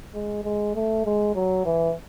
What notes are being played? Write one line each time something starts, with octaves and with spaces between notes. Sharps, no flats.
G#3
G#3
A3
G#3
F#3
E3